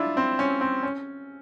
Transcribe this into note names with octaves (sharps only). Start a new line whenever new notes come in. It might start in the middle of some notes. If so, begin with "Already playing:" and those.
Already playing: D4 E4 F4
C4
C#4
C4
C#4